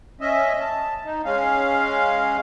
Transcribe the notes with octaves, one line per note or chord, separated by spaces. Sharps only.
C#4 D#5 E5
A5
D#4
G#3 C#4 F5